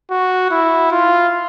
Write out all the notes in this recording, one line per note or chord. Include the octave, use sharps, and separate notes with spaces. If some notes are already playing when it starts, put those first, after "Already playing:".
F#4
E4
F4